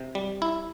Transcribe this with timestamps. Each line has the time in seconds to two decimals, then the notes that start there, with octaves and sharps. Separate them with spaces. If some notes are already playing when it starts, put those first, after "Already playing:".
Already playing: C3
0.15 G3
0.42 E4